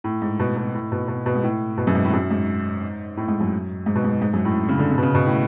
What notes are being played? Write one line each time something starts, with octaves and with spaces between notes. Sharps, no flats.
A2
G#2
B2
B2
A2
B2
B2
B2
G#2
A2
B2
F#2
G#2
A2
F#2
G#2
A2
G#2
F#2
G#2
B2
G#2
G#2
F#2
A2
C#3
D3
C#3
B2
C#3
B2
A2